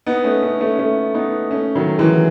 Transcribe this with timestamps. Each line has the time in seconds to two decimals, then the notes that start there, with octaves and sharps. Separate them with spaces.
0.06 B3 D#4
0.24 A3 C#4
0.42 A3 C#4
0.61 A3 C#4
0.79 A3 C#4
1.14 B3 D#4
1.51 A3 C#4
1.75 D#3 F#3
1.99 E3 G#3